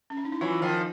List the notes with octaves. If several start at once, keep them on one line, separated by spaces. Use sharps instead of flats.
C#4
D4
D#4
E4
E3 F#3 F4
D#3 F3